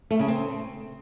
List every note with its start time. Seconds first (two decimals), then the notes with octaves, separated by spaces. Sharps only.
0.11 A3
0.19 C#3
0.28 C4